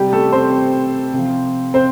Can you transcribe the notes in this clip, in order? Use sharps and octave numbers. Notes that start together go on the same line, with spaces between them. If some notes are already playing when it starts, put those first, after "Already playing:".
Already playing: C3 G3 G4
A3 A4
C4 C5
C3 F3
C4 C5